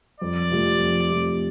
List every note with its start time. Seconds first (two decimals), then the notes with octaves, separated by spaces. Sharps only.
0.21 F2 D5
0.51 C3 F3 A3
0.79 F2
1.09 C3 F3 A3